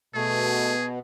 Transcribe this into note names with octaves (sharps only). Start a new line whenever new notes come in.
B2 A3 G#4